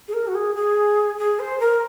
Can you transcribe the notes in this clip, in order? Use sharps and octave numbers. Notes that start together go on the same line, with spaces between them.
G#4
A#4
F#4
G#4
G#4
G#4
C5
A#4